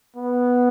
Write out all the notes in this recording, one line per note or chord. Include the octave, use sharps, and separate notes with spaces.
B3